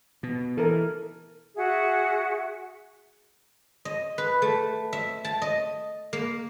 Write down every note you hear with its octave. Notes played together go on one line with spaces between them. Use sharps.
B2
E3 A4 A#4
F#4 G#4 E5 F#5
D#5
B4
A3
E5
A5
D#5
A#3